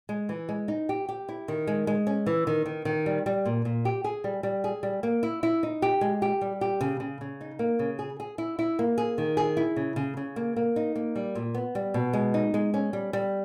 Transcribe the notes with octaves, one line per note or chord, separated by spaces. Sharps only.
G#3
E3
G#3
D#4
G4
G4
E4
D#3
G#3
G#3
C#4
E3
D#3
D#3
D#3
G3
G3
A#2
A#2
G4
G#4
G3
G3
G#4
G3
A#3
E4
E4
D#4
G4
G#3
G4
G3
G4
C#3
C#3
C#3
D#4
A#3
C#3
G#4
G#4
E4
E4
A#3
G#4
D#3
G#4
E4
C#3
C#3
C#3
A#3
A#3
D#4
A#3
G3
A#2
B3
G3
B2
G#3
D#4
G#3
C#4
G3
G3